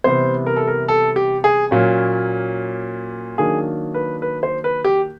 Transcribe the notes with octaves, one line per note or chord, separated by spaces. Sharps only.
C3 E3 G3 B3 C5
A#4
A4
A#4
A4
G4
G#4
A#2 F#3 A#3 C#4
D#3 F#3 A#3 D4 G#4
B4
B4
C5
B4
G4